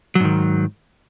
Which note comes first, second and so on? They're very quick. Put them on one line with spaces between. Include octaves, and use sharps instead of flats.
F#3 G#2 D#3